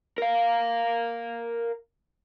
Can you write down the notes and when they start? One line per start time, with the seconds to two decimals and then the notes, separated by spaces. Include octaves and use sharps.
0.18 A#4 F5